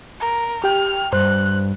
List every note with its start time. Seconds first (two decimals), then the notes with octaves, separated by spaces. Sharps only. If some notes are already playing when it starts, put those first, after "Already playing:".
0.20 A#4
0.64 G4 G5 F6
1.13 G2 C5 F#6